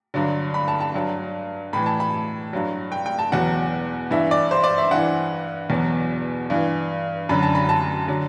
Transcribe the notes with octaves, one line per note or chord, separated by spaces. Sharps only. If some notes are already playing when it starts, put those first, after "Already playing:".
G2 D3 F#3
B5
A5
A5
G2 F#3
A2 E3 B5
A5
B5
G2 F#3
G5
G5
A5
E2 B2 F#3 F#5
G2 E3 E5
D5
C5
D5
E5
G2 E3 F#5
E2 B2 F#3
G2 E3
F#2 D3 F#3 B5
A5
B5
A5
D3 F#3